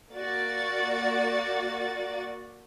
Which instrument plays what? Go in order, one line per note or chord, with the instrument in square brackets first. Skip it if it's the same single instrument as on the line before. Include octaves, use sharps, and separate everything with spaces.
[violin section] A#3 F#4 D5 A6